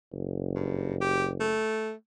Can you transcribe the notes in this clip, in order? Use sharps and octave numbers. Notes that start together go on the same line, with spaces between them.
F#1
G2
G4
A3